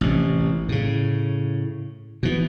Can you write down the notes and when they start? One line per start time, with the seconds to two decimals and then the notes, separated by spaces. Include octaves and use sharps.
0.01 A1 C3
0.69 A2 C#3
2.23 B2 E3